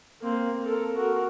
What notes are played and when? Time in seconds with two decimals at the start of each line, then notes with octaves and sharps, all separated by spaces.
0.22 A#3 C4
0.63 A4 A#4
0.96 F#4 A#4